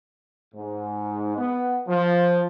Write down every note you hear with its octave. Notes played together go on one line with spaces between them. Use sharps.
G#2
B3
F3